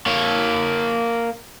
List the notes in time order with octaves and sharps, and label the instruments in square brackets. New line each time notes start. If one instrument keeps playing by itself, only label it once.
[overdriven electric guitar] A#3 C#5